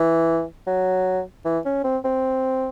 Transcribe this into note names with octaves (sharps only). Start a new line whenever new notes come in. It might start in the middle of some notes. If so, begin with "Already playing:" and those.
Already playing: E3
F#3
E3
C#4
C4
C4